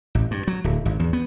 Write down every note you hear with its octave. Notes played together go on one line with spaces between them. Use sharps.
A1
G2
F#3
D1
G#1
E2
B3